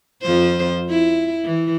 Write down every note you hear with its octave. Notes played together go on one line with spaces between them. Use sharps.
F2 F3 C5
E4
E3